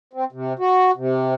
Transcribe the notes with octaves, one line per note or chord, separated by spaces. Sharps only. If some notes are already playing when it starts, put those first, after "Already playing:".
C4
C3
F#4
C3